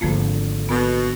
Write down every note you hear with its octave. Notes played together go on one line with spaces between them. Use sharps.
G#1 D3 D#3 F3 A3 A#3 F4
B2 B3